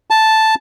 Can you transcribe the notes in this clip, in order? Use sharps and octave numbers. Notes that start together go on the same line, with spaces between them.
A5